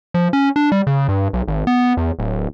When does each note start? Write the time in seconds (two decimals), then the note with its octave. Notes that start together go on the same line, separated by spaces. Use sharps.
0.14 F3
0.33 C#4
0.56 D4
0.72 G3
0.87 C#3
1.08 G2
1.33 B1
1.48 G#1
1.67 B3
1.97 E2
2.19 D1